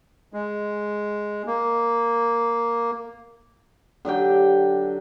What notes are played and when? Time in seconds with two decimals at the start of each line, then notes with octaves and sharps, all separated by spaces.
0.33 G#3
1.47 A#3
4.05 D3 F#3 G4 G5